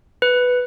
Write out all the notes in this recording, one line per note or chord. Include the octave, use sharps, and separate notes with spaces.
B4